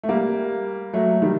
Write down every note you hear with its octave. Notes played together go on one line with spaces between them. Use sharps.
A3
G3 A#3
F#3 A3
D#3 G3